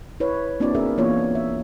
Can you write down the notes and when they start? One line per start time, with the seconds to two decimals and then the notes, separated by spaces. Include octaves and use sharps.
0.20 E4 B4 C#5
0.60 A#3 C4 D4 E4 F#4 D5
0.75 C#4 D4 G#4 A#4 E5
0.98 E3 A#3 B3 F4 C#5
1.35 E5